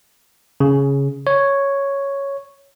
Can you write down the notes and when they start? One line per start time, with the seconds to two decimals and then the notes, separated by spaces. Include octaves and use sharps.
0.60 C#3
1.27 C#5